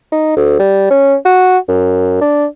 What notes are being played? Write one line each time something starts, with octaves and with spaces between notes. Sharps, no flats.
D#4
D2
G3
C#4
F#4
F#2
D4